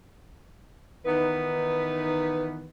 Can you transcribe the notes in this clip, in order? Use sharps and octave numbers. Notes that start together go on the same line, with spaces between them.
D#3 E3 B3 D#4 B4